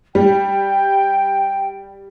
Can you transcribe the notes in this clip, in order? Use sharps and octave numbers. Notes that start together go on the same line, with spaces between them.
G3 G5